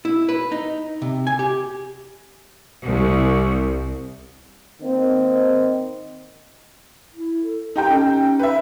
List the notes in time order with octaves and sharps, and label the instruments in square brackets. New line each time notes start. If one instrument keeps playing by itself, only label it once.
[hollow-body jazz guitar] E4
B4
D#4
C3
G#5
G4
[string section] C2
[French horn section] D#3 A#3 C4 D#5
[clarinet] E4
A4
[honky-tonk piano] D#4 G4 G5
[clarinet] C#4
[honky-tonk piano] B4 E5